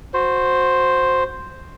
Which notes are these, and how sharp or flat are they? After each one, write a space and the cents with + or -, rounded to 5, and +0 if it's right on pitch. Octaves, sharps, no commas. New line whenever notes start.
F#4 -20 C5 +0